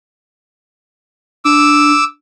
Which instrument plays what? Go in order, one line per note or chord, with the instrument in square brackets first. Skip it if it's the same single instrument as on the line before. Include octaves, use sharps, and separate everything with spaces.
[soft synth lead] D4 [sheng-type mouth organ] D6 E6